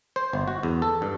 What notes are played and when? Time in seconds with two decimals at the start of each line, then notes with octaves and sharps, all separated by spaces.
0.16 C5
0.33 G1
0.48 F#4
0.63 E2
0.82 A4
1.02 G2